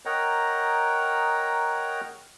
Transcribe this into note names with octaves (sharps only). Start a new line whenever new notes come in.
A#4 C#5 D#5 F#5 G5 A#5